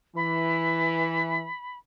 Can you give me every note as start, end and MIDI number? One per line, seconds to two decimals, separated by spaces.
0.16 1.46 52
0.16 1.78 83